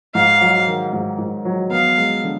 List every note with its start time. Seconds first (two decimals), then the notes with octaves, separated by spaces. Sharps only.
0.14 G#2 F5
0.41 F#3
0.67 D#3
0.93 G#2
1.18 G#2
1.45 F#3
1.71 B3 F5
1.98 G#3
2.24 D3